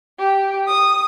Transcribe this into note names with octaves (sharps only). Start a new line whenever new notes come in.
G4
D#6